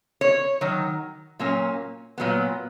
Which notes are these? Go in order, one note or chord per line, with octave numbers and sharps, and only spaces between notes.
C#5
D#3 F#3
A#2 F#3 A#3 C#4
A#2 F#3 B3